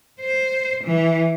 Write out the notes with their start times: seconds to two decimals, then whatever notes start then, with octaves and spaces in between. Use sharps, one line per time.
0.21 C5
0.84 E3